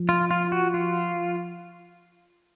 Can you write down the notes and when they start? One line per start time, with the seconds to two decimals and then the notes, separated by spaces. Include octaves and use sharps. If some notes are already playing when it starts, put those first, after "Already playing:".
Already playing: F3
0.09 F4
0.31 F4
0.52 F#4
0.74 F4